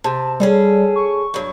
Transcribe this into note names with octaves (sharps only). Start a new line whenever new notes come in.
C3 A5
G3 C#4 G#4 A4
C#6
G2 F#3